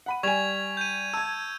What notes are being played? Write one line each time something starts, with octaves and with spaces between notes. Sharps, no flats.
F#5 B5 D#7
G3 G#5 C#6 G#6 F7
G6 D#7
A5 E6 G#6